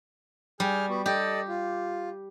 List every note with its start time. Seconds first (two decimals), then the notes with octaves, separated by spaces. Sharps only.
0.60 G3 G#4 F6 G6
0.89 B3 F#4
1.06 G4 A4 D5 D#5
1.48 F4